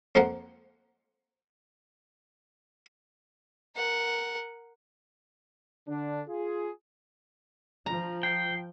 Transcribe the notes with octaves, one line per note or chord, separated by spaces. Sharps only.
F2 F3 A#3 C4 A#4 F#5
A#4 F#5
D3 D4
F4 G#4
F3 A#5
G5 C7